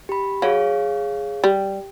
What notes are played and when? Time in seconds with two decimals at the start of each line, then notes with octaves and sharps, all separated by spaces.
0.09 G4 B5
0.42 F#3 G#4 C#5 F5
1.44 G3